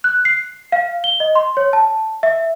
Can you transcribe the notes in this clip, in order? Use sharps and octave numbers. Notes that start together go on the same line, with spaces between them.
F#6
C7
F5
G7
D#5
C6
C#5
A5
E5